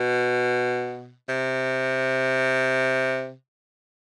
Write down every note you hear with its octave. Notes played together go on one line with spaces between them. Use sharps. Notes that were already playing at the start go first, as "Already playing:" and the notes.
Already playing: B2
C3